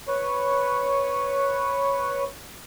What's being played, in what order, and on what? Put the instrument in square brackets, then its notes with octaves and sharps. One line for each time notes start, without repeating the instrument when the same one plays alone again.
[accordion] B4 C#5